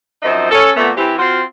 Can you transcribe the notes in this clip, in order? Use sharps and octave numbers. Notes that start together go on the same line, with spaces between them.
F#2 F3 C4 D#4 C5 E5
C#4 A4
A#2 A3 B3
E3 C4 G4
C4 F4 F#4